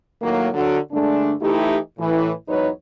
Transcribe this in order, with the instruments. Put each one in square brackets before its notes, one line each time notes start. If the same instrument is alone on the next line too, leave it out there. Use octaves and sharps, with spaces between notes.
[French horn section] A2 D#3 F#3 A#3
D3 F#3
G2 D3 G#3 A3 D4
E3 A3 D#4 E4 G4
A2 E3
E2 G#2 F#3 D#4 B4 C#5